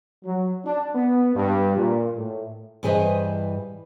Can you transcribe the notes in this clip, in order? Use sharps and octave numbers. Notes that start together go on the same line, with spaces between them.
F#3
D4
B3
G2
A#2
A2
G2 E3 G#4 B4 C5 D#5